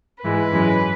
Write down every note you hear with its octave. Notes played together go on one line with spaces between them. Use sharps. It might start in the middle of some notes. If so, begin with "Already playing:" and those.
G#2 E3 G#3 B4
F#2 E3 G#3